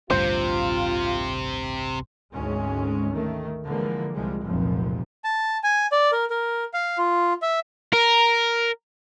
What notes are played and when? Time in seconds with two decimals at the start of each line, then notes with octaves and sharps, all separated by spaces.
0.10 A1 D2 G2 C3 F4 C5
2.32 G#1 D2 G#2 G#3 C#4
3.12 D#3 A3
3.64 D3 E3 F3 G#3 A#3
4.12 C2 F3 G3 G#3
4.43 F1 C#2 F#2 A#2 F3
5.24 A5
5.63 G#5
5.92 D5
6.12 A#4
6.30 A#4
6.74 F5
6.98 F4
7.42 E5
7.93 A#4